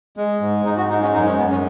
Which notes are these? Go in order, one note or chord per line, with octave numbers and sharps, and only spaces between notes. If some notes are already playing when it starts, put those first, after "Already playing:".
G#3
G#2
G#2 D#4
F#4
G#3 D#4
C#4
F#2 D#4
C#4
F#2 B3
C#4